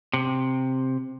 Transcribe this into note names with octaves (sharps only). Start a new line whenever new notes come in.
C3